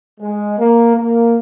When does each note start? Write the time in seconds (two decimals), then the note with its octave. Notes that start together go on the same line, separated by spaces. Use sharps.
0.20 G#3
0.58 A#3
0.96 A#3